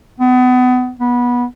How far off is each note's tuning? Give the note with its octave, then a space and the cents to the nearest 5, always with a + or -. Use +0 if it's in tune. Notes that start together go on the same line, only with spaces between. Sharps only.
B3 +30
B3 -20